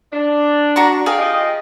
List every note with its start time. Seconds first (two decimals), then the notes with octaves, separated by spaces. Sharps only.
0.13 D4
0.76 F#4 A#5 C#6
1.06 G#4 F5 G5
1.18 F4 G4 D#5